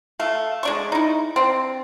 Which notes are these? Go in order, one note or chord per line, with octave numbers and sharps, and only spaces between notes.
A3 F5
G#3 D4 C#6
D#4 E4
C4 D4